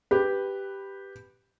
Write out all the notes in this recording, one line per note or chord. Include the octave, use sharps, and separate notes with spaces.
G4 B4